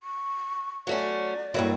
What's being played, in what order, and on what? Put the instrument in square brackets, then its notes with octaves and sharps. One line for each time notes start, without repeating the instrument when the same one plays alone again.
[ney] C#6
[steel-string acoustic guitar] F#3 A3 C#4 [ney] D5
[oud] G2 A#3 E4 [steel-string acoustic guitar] F#3